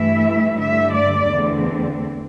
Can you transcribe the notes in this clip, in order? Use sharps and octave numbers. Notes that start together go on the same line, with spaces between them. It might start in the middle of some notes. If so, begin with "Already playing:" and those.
Already playing: G2 E3 A3 E4 E5
G2 D3 A3 E5
D5
E2 D3 A3 C4